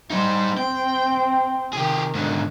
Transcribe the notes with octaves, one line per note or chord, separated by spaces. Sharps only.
G3 D#4 C5
C4 G5
C3 D#3 G4 G#4
G#2 D3